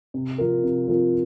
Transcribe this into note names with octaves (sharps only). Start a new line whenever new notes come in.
C3
F3 C4 F4 A#4
C3
F3 C4 F4 A#4